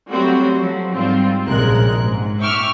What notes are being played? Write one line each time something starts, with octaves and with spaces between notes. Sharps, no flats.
F#3 G3 A3 C4 F#4
F3 F#3
G#2 G3 C4 F4
A#1 F#2 C3 G#3 A#4 F#6
G#2
E5 G5 C#6 D6 E6 F6